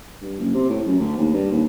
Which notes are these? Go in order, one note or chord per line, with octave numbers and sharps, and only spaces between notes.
G2
F#1
C3
A2
F#2
D2
D#2
G2
D#2